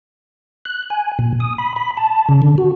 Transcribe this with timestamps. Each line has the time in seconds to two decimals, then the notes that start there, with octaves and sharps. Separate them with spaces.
0.65 F#6
0.90 G#5
1.19 A#2
1.40 D#6
1.58 B5
1.76 B5
1.97 A5
2.29 C#3
2.42 D3
2.58 F#4